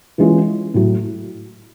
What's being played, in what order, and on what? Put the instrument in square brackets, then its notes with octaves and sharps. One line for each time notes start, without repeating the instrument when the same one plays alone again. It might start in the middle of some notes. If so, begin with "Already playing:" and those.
[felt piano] E3 G#3 C#4 F4
A2 F#3